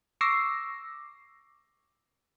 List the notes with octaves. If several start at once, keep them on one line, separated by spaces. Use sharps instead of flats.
C#6 D6 E6 A#6 C7